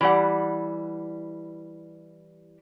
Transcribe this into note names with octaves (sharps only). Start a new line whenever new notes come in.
E3 G3 F#5